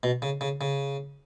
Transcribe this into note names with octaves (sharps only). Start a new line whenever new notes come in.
B2
C#3
C#3
C#3